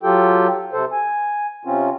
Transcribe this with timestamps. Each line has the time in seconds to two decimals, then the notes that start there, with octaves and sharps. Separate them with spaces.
0.03 F#3 F4 G4 A4 G5
0.73 C3 A4 C5
0.92 G#5
1.65 C3 C4 C#4 F4